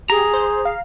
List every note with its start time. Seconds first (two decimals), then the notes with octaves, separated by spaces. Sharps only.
0.10 G4 G#4 A#5
0.34 C5
0.65 F5